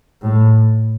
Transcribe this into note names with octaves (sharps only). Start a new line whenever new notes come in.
A2